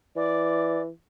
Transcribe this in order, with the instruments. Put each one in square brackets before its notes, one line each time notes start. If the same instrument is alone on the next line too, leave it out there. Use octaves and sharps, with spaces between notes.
[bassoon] E3 [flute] D5